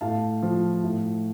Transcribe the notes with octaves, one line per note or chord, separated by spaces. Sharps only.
A2 F5 A5
F3
A2